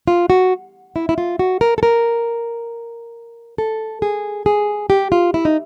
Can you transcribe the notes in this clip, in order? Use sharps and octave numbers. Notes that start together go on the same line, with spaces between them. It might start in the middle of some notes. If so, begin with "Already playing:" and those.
F4
F#4
E4
E4
F4
F#4
A#4
A4
A#4
A4
G#4
G#4
G4
F4
E4
D#4